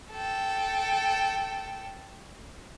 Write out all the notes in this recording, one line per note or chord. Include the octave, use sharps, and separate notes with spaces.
A4 G5